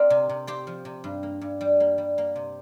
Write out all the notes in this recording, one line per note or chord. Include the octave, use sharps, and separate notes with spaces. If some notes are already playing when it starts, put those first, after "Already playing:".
Already playing: C4 A#4 D5 F5
C3
C3
C4 G4 C5
F3
C3
G2
A#3
G2
G3
A#3
G3
A#3
C3